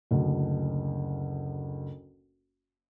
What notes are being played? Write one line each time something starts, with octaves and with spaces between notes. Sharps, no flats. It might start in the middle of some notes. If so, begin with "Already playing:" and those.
F#1 D2